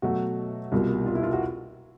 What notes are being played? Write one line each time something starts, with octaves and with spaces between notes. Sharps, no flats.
B2 F#3 A3 F#4
C2 B2 G3 A#3 F4
F4
E4
F4
F#4